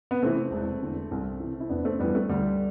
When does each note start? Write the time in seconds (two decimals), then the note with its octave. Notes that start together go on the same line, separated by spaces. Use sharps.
0.11 B3
0.22 C3 E3 A3 C4
0.51 E1
0.82 E2 D3
1.11 C2
1.40 C3 E3
1.60 E4
1.70 F1 B3 D4
1.85 A3 C4
1.99 F2 E3 G3 B3
2.15 A3
2.29 D2 G3